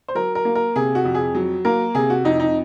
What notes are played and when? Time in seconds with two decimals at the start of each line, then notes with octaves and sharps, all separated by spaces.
0.08 C5
0.15 F#3 A#4
0.35 A#4
0.45 A#3
0.55 A#4
0.76 C3 G#4
0.95 F#4
1.05 F2
1.15 G#4
1.35 F#3
1.65 A#3 A#4
1.95 C3 G#4
2.10 F#4
2.24 F2 D#4
2.40 D#4